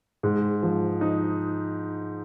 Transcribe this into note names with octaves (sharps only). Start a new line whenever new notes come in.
G#2
F3
D#4